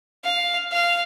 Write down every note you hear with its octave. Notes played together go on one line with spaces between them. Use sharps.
F5
F5